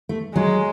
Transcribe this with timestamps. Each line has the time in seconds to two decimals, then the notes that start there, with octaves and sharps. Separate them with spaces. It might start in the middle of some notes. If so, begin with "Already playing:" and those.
0.09 A3
0.35 F#3 G#3